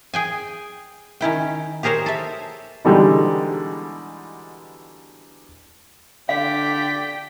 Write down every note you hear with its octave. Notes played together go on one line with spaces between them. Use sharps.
G#4 G5 G#5
D#3 C#4 E4 G5
G4 G#4 A#4 C5 C#5
A4 E5
B2 D3 E3 G3 G#3 D#4
D3 D5 F5 G5 B6